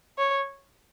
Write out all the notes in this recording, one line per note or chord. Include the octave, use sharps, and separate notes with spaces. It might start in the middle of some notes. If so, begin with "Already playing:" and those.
C#5